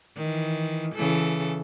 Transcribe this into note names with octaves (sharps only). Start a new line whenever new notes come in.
D#3 E3
C#3 E3 A4